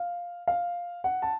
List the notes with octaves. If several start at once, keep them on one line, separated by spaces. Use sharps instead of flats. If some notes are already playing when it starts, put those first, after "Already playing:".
Already playing: F5
F5
F#5
A5